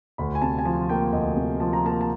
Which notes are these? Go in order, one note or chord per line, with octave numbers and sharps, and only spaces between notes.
D2 B5
G#5
C3 A5
G#5
F3 A5
A#3 G5
D2 D#5
C3
F3 A5
A#5
A#3 A5
A5